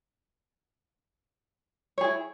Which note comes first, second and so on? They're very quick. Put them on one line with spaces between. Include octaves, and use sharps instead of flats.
C#5 G#4 E4